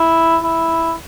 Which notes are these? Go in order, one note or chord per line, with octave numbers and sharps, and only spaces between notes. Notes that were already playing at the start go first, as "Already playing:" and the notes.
Already playing: E4
E4